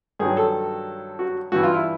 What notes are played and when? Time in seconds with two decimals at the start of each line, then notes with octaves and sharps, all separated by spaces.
0.19 G2 D#3 F#3 G#4
0.37 A4
1.19 F#4
1.52 G2 E3 F#4
1.63 F4
1.74 E4